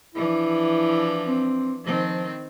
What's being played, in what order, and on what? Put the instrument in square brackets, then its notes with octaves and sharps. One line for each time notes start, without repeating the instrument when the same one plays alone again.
[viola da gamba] E3 F3 D4 [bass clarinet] E4
[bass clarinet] C4
[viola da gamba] D#3 C4 [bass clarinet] F3